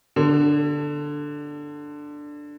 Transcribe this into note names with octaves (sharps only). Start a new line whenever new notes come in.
D3